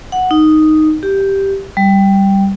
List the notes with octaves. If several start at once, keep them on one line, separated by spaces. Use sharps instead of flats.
F#5
D#4
G4
G3